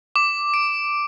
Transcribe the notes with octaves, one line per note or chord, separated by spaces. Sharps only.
D6
D7